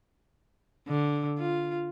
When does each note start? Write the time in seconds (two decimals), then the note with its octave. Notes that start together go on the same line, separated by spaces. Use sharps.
0.88 D3
1.39 F4